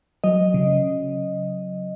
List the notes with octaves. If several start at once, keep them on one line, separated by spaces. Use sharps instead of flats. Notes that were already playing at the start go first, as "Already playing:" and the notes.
F#3 D#5
C#3